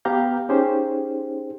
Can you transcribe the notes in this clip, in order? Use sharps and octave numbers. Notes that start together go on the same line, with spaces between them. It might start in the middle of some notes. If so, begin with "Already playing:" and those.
B3 G4 F5 A#5 G6
C#4 D#4 G4 G#4 C5